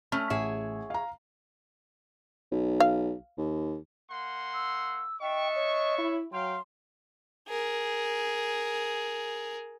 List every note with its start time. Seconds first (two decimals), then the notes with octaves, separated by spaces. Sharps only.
0.12 A3 C#4 F6
0.30 A1 G#4 C#5 E5
0.90 F5 A#5
2.52 B1
2.80 F5
3.38 D#2
4.10 A#3 F#5 C6
4.54 E6
5.21 D4 D#5 E5 G5 C#6
5.56 C#5
5.98 E4
6.33 F#3 F5 G5 C6
7.48 G#4 A#4